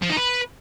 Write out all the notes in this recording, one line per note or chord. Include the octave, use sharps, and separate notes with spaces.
F3
D#4
B4